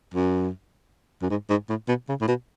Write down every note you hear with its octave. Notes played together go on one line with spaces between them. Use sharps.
F#2
F#2
G#2
G#2
A2
B2
C#3
A2
B2